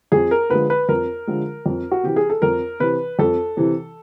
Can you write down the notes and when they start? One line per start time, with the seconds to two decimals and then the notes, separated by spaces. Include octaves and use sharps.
0.12 F2 G#4
0.31 A#4
0.50 D3 F3 G#3 B4
0.70 B4
0.89 F2 A#4
1.27 D3 F3 G#3
1.66 F2
1.91 F#4
2.03 C3 E3 G4
2.16 G#4
2.30 A4
2.42 F2 A#4
2.80 C3 E3 B4
3.19 F2 A4
3.57 C3 E3